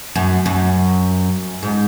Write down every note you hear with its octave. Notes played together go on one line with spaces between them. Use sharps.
F#2
F#2
G#2